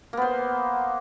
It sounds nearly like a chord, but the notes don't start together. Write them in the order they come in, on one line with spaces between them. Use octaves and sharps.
A#3 B3 C5